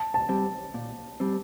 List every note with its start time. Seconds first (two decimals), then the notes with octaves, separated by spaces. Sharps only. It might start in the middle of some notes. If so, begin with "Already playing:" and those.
Already playing: A5
0.14 A5
0.29 G3 C4
0.74 A#2
1.20 G3 C4